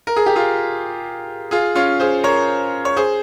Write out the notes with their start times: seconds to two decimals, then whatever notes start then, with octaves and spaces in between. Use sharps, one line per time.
0.07 A#4
0.17 G#4
0.26 G4
0.35 F4 G#4
1.51 F4 G#4
1.75 C#4 F4
2.00 G#4 C5
2.24 A#4 C#5
2.85 C#5
2.97 G#4 C5